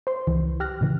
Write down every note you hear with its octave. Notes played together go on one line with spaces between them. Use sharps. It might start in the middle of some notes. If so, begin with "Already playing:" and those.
C5 C6
C#2 E3
G4 F6 F#6 A#6
A2 C#3 E3